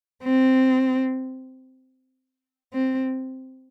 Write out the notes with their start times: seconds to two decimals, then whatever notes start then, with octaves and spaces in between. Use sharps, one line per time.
0.24 C4
2.73 C4